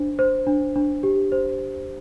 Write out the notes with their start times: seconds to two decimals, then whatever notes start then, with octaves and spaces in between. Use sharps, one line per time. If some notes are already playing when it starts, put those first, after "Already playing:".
Already playing: D4 C5
0.19 C5
0.47 D4
0.76 D4
1.03 G4
1.32 C5